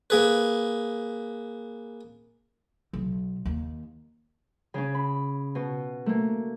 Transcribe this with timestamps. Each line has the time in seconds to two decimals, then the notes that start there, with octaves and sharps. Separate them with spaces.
0.10 A#3 G#4 B4
2.93 B1
3.45 D#2
4.74 C#3 C#4
4.95 B5
5.55 B2
6.06 A3 A#3